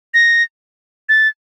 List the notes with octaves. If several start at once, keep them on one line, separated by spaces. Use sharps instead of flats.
A#6
A6